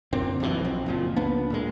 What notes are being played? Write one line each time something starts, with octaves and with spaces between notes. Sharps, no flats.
F#2 A#2 D3 C4
D#1 B1 B2 E3
B1 F3 C4
F#1 A#2 F3
C#2 A#3 B3 D4
D1 A#2 G#3